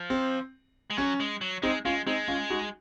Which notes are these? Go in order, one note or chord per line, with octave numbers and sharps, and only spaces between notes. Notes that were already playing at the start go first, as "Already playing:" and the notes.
Already playing: F3
C4
G#3
F#3 C#4
G#3
F#3
G#3 C4 D#4
G#3 C#4 F4
G#3 C4 D#4
C#4 F4
D#4 F#4